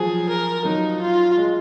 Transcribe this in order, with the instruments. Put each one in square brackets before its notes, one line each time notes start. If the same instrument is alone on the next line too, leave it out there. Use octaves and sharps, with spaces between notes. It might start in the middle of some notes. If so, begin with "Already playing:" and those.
Already playing: [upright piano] F3 F#3 [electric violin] G#4
[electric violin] A#4
[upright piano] F#3 [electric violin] D#4
[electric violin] F4
[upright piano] G#3